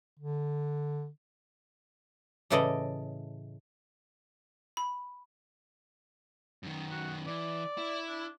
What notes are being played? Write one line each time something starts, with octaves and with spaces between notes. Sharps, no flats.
D3
A2 C#3 E3 A4 D5 D#5
B5
F#2 D#3
F#4
E3 D5
E4
D4